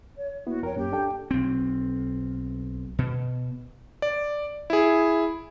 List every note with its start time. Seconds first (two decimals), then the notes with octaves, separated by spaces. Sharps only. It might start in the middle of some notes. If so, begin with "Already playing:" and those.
0.17 C#5
0.47 A#3 B3 E4 F#4
0.63 F2 A#4 C#5 G5
0.76 F#2 A#3 C#4 G4
0.92 D4 A4 G5
1.31 B1 C4
2.99 B2
4.02 D5
4.70 E4 G#4